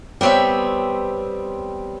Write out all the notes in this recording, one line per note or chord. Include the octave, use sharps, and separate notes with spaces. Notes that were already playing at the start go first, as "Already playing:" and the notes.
G3 B3 C4 C#5 E5